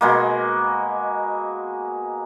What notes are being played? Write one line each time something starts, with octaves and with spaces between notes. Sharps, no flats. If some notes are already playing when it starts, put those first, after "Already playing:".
B2 G#3 A#3